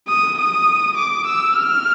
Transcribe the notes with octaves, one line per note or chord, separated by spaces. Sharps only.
D#6
D#6
D6
E6
F6